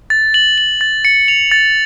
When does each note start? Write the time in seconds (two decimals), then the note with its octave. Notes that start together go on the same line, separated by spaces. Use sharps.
0.10 A6
0.34 F#7
0.58 F#7
0.81 A6
1.05 C#7
1.28 F7
1.52 A6